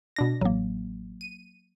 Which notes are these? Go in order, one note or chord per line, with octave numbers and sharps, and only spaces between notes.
B2 D4 A#6
A1 F#3 A#3
D#7